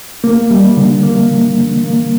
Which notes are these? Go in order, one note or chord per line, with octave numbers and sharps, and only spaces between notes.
A#3
G3
D3
A#3
D3
D3
A#3